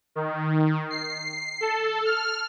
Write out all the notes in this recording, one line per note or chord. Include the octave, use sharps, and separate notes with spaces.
D#3
C7
A4
F6